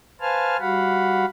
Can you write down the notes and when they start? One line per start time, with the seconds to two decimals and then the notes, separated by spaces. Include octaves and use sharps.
0.21 B4 C5 F5 G#5 A5 F6
0.60 G3 F#4 F5 F#5 B5